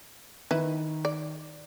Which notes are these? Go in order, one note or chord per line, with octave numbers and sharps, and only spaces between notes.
D#3 E4 B4
D5